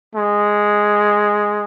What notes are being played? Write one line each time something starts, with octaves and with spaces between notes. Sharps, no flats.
G#3